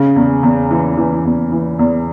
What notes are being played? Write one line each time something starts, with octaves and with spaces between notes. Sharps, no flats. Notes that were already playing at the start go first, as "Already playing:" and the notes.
Already playing: C#3
E2
E2
E3
E3
E2
E3
E2